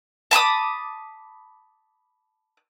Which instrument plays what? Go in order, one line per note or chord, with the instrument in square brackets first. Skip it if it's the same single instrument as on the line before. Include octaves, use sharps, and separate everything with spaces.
[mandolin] A5 B5 D6 D#6